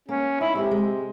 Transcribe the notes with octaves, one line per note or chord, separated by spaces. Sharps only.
A#3 C#4
D#4 E4
C3 G#3 G4 A#4
G#3